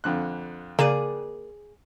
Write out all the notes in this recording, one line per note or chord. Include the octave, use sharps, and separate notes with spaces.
F2 D3 F#6
C#3 A#3 G#4 D5 D#7